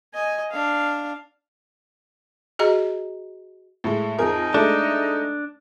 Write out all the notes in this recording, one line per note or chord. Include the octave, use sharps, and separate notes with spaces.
D#5 G#5
D4 F5
F#4 G#4 D#5 A#5
A2 G#3
F2 D#4 G#4 A#4
G#3 A3 D4